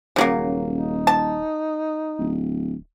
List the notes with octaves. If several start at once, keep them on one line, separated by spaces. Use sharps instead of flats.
D#1 C#3 F#3 A#3
D#4
A5
D1